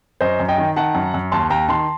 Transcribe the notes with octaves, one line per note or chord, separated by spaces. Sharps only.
F#2 C5 D#5
F#2
D#5 G5
D#3
D#3 F#5 A5
F#2
F#2
D#2 A5 C6
D#2 G5 A#5
D#3 A5 C6